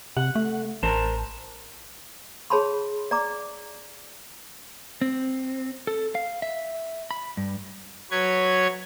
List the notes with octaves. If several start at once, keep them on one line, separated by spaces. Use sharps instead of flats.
C3 F#5
A3
A1 A#4 C5 A5
G#4 C#5 A5 B5 C6
D5 A#5 D6
C4
A4
F5
E5
B5
G2
F#3 B4 C#5 G#6